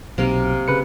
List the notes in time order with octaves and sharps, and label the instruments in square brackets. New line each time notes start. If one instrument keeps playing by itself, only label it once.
[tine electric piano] B1 [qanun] C3 A#3 F5
[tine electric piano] C#3 B4 C#7